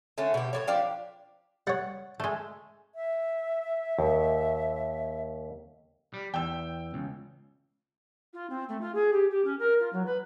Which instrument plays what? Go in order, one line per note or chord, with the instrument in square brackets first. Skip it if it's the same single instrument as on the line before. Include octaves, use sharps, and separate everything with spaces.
[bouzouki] D3 A3 C#4
B2 G4
A2 F3 C#5
F3 D4 G4 F5
[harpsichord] G3 C#5 [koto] F#5
[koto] G#3 A3
[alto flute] E5
[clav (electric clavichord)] D#2
[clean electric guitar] G3
[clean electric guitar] E2 [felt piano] G5 E6
[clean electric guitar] C#2
[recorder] F4
C4
A3
F4
G#4
G4
G4
C#4
A#4
F4
F#3
B4